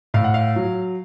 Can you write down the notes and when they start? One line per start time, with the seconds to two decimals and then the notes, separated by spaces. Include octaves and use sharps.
0.14 A2 F5
0.24 F#5
0.34 F5
0.56 F#3